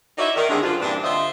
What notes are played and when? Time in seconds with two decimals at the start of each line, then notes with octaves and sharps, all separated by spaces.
0.18 D#4 E4 F#4 C#5 D5 E5
0.37 D#3 A#4
0.49 D3 D#3 G3 C4 D4 G#4
0.63 F#2 F3 G3 D4 F4
0.80 G2 A#2 E3 C4 D4
1.03 D3 F4 C5 D#5 E5